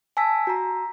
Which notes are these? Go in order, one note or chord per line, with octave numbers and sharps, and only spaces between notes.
G#5 A5 E6 B6
F#4 A#5